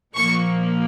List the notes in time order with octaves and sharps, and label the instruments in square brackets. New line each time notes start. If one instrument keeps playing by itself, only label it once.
[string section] A#2 F3 A#3 C#6